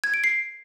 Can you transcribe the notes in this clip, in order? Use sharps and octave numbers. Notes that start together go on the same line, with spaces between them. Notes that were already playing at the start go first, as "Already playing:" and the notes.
G#6
D7
C7